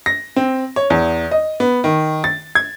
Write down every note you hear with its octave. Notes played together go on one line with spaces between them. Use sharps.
A#6
C4
C#5
E2
D#5
B3
D#3
A6
G#6